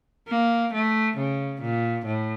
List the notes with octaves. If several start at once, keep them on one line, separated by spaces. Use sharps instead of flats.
A#3
A3
C#3
A#2
A2